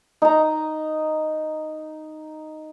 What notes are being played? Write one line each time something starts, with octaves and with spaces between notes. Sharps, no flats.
D#4 A#5